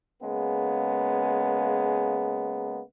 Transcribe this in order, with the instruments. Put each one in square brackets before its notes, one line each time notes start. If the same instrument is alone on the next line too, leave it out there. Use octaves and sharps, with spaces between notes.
[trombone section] C#3 G#3 A#3 B3